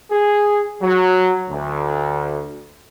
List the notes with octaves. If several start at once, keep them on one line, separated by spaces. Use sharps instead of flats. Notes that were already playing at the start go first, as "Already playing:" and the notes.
G#4
F#3
D2